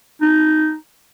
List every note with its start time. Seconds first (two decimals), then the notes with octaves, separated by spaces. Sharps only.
0.22 D#4